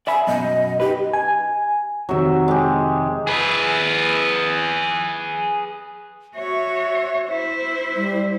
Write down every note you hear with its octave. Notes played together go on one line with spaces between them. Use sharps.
D5 E5 G#5 B5
F#2 B2 D#5
D#4 G4 B4
G#5
F1 C3 D#3 F#3 E5
G#3 G4
G#4 B4
F#4 C#5 E5
E4 C5
G3